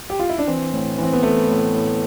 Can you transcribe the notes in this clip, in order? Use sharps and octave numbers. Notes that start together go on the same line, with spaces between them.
G4
F4
E4
D4
E3 C4
A2
E3 C4
B3
E3 A3
A2
A2